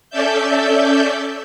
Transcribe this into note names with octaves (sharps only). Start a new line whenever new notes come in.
C#4 A4 D5 E5 G6